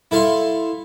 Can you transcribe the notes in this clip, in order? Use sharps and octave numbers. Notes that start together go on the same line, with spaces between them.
E4 A4 F5 C6 C#6